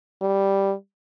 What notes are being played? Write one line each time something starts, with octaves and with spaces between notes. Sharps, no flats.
G3